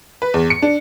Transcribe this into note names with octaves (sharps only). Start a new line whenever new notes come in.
B4
E2
C#7
D4